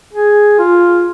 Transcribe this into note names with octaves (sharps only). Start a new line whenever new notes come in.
G#4
F4